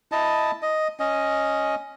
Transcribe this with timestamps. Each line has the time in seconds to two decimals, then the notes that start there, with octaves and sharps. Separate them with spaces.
0.12 E4 D#5 A5
0.62 D#5
1.00 C#4 D#5